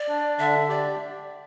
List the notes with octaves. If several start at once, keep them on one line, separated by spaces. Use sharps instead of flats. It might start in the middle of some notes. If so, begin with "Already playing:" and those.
Already playing: D5
D4
D3 E5
G4 D5